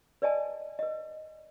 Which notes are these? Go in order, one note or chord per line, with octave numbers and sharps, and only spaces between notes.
B4 D5 D#5 G#5 A5
B4 D#5